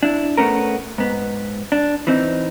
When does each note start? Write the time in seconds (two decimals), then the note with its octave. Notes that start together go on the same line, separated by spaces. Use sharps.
0.03 D4 E4
0.37 A3 B3 C#4 A#4
0.98 G#2 B3
1.72 D4
2.07 E3 C4 D#4